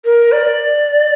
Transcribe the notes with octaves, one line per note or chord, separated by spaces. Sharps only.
A#4
D5